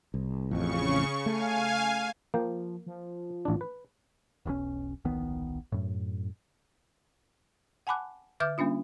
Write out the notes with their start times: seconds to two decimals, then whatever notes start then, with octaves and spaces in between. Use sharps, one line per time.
0.14 C2
0.51 A1 F2 C#3 C#6
1.26 A3 F5 G#5
2.34 F3 A#3 G5
2.86 F3
3.45 A1 D4
3.61 B4
4.46 E1 B1 C#3 C#4
5.05 D1 A#1 D#3 B3
5.72 F#2 A2
7.87 F#5 G#5 A5 B5 D6 F#6
8.40 D3 B4 E5 D6 F6 G6
8.58 G3 A#3 C#4 D4 F4